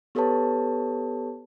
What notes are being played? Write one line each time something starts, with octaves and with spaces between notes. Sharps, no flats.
B3 G4 A4 B4 C#5 A5